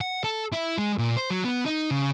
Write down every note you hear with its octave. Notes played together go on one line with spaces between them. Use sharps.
F#5
A4
E4
G#3
A#2
C5
F#3
B3
D#4
C#3